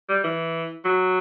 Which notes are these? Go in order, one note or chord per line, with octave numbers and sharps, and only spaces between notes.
G3
E3
F#3